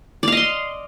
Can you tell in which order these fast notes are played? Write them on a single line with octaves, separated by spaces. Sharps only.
D5 F5 D#5 C6